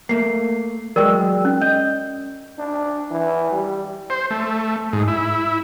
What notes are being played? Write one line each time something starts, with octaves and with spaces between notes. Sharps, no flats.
A3 A#3 C7
F#3 G#3 A#4 D5 G5 E6
C#4
D#5 G6
D4
E3
G3
C5
A3
G#2
E4